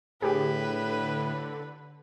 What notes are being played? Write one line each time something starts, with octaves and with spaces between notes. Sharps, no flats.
A2 D3 G4 G#4 B4